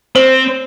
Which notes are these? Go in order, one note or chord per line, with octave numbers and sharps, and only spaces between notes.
C4 C5